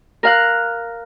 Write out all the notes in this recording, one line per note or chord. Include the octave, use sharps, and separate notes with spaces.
A#4 F5 F#6